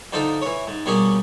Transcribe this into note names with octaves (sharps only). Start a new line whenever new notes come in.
D3 F3 D#4 A4
E3 C#5
G#2
B2 G3 A#3 C#4 G#4